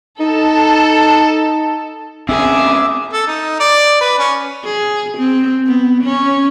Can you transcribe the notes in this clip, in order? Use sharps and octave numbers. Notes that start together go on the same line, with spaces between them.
D#4 A4
E2 C3 C#4 G#4 E5 D6 E6
A4
D#4
D5
B4
C#4
G#4
C4
B3
C#4